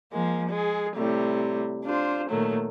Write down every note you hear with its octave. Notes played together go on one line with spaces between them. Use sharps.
F3 G#3 A#3
G#3 G#4
A2 C3 G3
D4 F4 C5
A#2 D#3 F#3 A3